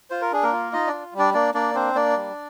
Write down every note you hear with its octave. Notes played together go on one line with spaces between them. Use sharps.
F4 C5
A#4
D4 G#4
A#3 A#4
F4
D#4 F4 D#5
D4 D5
F4
G3
D4 D5
A#3 D4 D5
A#3 D4 D5
C4 D4 C5
A#3 D4 D5
G3